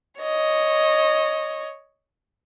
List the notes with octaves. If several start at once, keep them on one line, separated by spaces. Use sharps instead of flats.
C#5 D#5